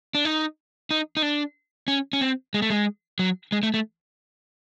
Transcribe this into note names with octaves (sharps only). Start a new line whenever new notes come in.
D4
D#4
D#4
D#4
D4
C#4
C#4
C4
G#3
A3
G#3
F#3
G#3
A3
A3